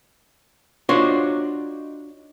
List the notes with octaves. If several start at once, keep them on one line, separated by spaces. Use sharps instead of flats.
D4 D#4 F4 F#4 C5 C#5